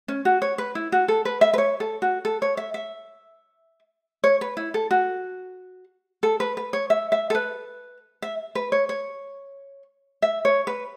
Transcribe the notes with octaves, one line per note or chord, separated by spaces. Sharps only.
C#4
F#4
C#5
B4
E4
F#4
A4
B4
E5
B4
C#5
A4
F#4
A4
C#5
E5
E5
C#5
B4
E4
A4
F#4
A4
B4
B4
C#5
E5
E5
A4
B4
E5
B4
C#5
C#5
E5
C#5
B4